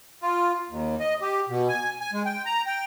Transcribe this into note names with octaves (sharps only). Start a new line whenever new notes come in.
F4
D#2
D#5
G4
B2
G#5
G#5
G#3
G5
A#5
G5